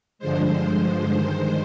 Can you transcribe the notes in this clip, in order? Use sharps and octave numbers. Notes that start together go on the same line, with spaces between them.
G2 D3 F3 G#3 C5
G2 D#3 G#3 C5